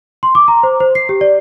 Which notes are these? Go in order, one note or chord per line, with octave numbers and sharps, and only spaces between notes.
C6
D6
A#5
C5
C5
C7
G4
D5